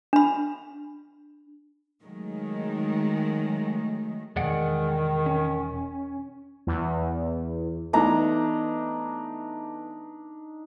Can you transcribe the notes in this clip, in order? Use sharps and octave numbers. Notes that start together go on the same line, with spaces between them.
D4 B5
D#3 F#3 G#3 A3
E1 D#3 G#3 D5 F#5
C#4
E2
E3 A3 B3 D4 D#4 A#5